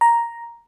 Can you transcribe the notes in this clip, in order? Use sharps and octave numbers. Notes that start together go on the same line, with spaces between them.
A#5